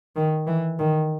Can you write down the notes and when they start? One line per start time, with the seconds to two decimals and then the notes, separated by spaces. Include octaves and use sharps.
0.16 D#3
0.47 E3
0.79 D#3